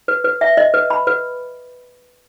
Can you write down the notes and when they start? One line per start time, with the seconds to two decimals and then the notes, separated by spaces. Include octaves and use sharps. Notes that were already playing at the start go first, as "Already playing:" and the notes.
0.08 B4
0.24 B4
0.41 E5
0.57 D#5
0.74 B4
0.90 B5
1.07 B4